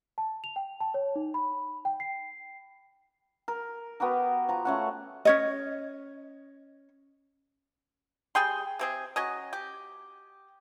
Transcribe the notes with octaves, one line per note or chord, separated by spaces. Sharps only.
A5
F7
G5
A5
C#5
D#4
B5
G5
C7
A#4
B3 F#4 G4 A#4
F3 A#5
A3 C#4 F#5
C#4 C#5 D#5
G3 G#4 G5 C6
C3 C4 G#4
F#3 C#4 D#5
G4